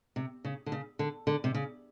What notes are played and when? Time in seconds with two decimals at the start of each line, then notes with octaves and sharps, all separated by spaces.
0.16 C3
0.45 C#3
0.66 D3
0.72 C#3
0.99 D3
1.27 D3
1.44 C3
1.54 C#3